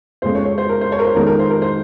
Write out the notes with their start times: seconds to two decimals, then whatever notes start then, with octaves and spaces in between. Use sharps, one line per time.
0.22 F2 C#3 G#3 C#4 C5
0.35 C#5
0.45 C#5
0.58 C5
0.69 A#4
0.81 C5
0.92 C#5
0.99 A#4
1.05 C5
1.15 F2 D#3 G#3 A#4
1.27 A#4
1.39 C5
1.50 A#4
1.62 C5